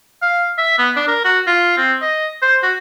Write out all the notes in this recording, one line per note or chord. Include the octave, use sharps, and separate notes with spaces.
F5
E5
B3
D4
A#4
F#4
F4
C4
D#5
C5
F#4